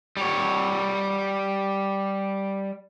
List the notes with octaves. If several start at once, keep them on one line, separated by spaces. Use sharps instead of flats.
G3 C#5